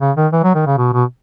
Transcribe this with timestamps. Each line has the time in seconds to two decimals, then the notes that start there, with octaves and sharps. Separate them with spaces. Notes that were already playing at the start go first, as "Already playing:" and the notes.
0.01 C#3
0.16 D#3
0.32 E3
0.44 F#3
0.55 D#3
0.67 C#3
0.78 B2
0.93 B2